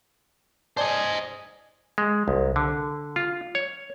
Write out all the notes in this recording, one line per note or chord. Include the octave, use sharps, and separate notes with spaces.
C5 D5 D#5 G#5 A5
G#3
C2
D3
F4
C#5